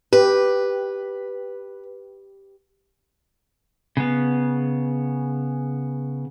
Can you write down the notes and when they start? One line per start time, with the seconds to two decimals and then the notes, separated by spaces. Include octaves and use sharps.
0.13 G4 B4
3.97 C#3 B3